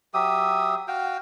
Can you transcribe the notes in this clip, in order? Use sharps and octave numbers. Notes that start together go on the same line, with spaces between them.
F#3 G4 E5 D#6
F#4 F5 G5